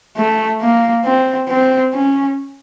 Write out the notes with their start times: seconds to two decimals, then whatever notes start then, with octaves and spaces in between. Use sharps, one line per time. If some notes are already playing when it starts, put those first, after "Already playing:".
0.17 A3
0.62 A#3
1.05 C4
1.49 C4
1.94 C#4